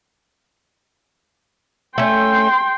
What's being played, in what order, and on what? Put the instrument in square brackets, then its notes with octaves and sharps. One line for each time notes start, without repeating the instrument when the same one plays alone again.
[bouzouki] A3 C#4 [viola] G5 C6